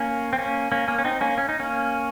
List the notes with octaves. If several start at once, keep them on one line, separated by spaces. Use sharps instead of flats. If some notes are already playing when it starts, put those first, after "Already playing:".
Already playing: A#3 C#4
C4
A#3 C#4
A#3 C#4
A#3 C#4
C#4
C4 D#4
A#3 C#4
C#4
D#4
A#3 C#4